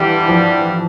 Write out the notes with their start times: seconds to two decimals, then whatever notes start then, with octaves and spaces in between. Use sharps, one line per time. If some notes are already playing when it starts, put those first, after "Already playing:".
Already playing: G2 D3 E3 G3
0.28 F3